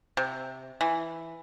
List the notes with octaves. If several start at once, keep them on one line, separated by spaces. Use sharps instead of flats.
C3
E3